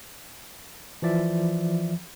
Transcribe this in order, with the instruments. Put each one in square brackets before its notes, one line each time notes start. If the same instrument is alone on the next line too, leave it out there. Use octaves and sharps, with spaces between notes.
[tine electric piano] E3 F3 D5 E5